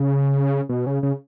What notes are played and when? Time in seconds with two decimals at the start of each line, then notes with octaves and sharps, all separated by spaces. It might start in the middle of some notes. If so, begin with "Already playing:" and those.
Already playing: C#3
0.69 B2
0.86 C#3
1.03 C#3